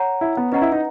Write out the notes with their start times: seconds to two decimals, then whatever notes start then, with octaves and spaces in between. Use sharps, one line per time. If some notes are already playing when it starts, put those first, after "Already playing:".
Already playing: C#5 F#5 A#5
0.21 E4
0.37 B3
0.52 C#4 B4 D#5 F#5 A#5
0.61 E4
0.72 D#4